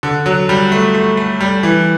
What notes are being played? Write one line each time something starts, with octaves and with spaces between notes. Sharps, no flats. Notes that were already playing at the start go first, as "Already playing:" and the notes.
D3
F#3
G3
A3
A3
A3
G3
E3